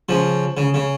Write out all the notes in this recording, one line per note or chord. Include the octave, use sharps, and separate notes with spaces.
C#3 F3
C#3
C#3